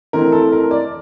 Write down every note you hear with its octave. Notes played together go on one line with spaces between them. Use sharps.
E3 A3 C4 A#4
A4
A#4
D5